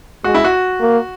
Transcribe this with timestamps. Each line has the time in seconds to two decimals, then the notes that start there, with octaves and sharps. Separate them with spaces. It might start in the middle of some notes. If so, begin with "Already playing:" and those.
0.24 G#3 F#4
0.34 E4
0.44 F#4
0.81 A#3